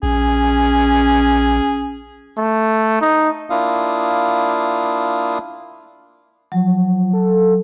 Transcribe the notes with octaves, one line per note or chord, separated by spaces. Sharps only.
A#1 C#4 G#4
A3
D#4
A#3 D4 E4 F4 F5 D#6
F3 F#3
A4